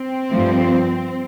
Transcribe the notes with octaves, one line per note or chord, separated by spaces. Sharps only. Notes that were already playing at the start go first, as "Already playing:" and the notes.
Already playing: C4
G2 F3 A3